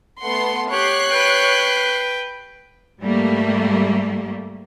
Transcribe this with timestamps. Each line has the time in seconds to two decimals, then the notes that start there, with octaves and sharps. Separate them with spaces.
0.22 A3 B3 F#5 C6
0.72 G4 C#5 F#6 C7
1.11 B4 G5
3.02 G#2 G3 A3 A#3